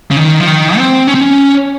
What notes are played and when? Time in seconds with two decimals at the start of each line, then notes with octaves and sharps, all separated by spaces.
0.11 C#3
0.16 D#3
0.40 F3
0.47 D#3
0.77 C4
1.07 C#4
1.15 C4
1.21 C#4